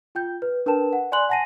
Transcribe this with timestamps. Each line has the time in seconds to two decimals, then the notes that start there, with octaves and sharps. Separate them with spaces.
0.15 F4 G5 G6
0.42 B4
0.66 D4 A#4 B4 G5 A5 E7
0.93 F#5
1.12 D5 G#5 B5 C6 F#6 F#7
1.29 F#5 G#5 A5 A#6 C7 D#7